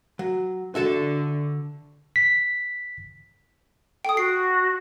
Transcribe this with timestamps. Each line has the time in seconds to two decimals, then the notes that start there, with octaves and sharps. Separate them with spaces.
0.19 F#3
0.75 D3 F#4 A4 E5 A5
2.16 B6
4.05 A4 G5 D#6
4.17 F#4 C7